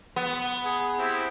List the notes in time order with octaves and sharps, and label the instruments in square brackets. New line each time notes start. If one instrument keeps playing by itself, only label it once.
[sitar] B3
[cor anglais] G#4
[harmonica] C4 E4 G4